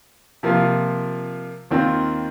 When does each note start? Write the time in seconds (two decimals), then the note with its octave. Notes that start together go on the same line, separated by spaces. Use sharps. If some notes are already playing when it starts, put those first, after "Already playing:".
0.43 C3 F3 A#3 F4
1.71 D#2 D#3 C4 F4